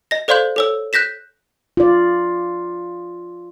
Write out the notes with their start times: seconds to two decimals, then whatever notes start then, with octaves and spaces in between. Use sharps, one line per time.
0.11 D#5 A#6
0.28 A4 C5 D5 F5 C6 G6
0.56 A4 C#5 E6
0.93 F#6 G6 A#6 B6 E7
1.77 F4 D5